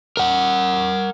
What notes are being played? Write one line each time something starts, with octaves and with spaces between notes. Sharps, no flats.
A#4 F#5